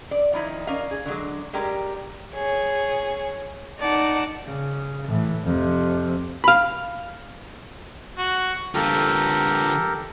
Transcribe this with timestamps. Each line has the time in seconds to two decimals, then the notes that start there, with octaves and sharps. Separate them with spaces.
0.11 D5
0.33 D#3 F3 D#4 E4
0.67 C#4 A#4 D5 D#5 F5
0.91 G#4
1.06 D3 F#3 G#3
1.53 G3 G#3 G4 A#4
2.34 G#4 C#5
3.79 D#4 D5 F#5 A5
4.47 C#3
5.08 A2 E3
5.44 F2 C3
6.44 F5 B5
8.18 F#4
8.74 D3 F4 G4 A4 A#4